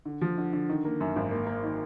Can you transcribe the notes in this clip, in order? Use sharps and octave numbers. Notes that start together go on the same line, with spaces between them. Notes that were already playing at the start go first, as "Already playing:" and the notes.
D3
F3
D3
D3
D#3
A#3
F#2
G#1
A#3
A#3
D#3